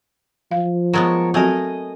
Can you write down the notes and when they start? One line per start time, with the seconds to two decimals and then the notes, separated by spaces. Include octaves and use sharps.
0.51 F3 F5
0.93 F#3 G#3 B3 A#4 C#5 A5
1.34 F#3 A3 C4 F#4 A#4 D#5 G#5